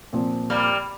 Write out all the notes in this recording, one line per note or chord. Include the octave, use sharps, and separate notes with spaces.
A#2 F3 C4
G3 A#3